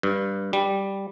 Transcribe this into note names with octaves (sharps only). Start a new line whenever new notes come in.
G2
G3